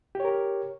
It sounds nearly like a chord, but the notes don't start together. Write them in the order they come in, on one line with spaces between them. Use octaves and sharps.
G4 C#5 A#4